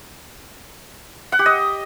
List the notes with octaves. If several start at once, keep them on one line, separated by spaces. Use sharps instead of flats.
F#5
G4
D#5